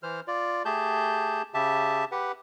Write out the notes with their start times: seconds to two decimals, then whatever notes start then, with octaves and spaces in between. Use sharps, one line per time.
0.03 E3 C5 F6
0.27 F4 D5
0.65 A3 G4 G#4 A5 G6
1.54 C#3 G4 E5 A5
2.12 G4 B4 F#5